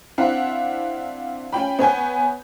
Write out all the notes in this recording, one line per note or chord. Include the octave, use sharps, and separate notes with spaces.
C4 D4 E4 F5 F#5
C#4 F4 G5 B5
B3 C#5 G#5 G6